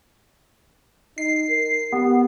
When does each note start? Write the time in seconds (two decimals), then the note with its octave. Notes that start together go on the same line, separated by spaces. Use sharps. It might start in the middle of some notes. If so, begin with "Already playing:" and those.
1.18 D#4 C7
1.49 A#4
1.92 B3 G4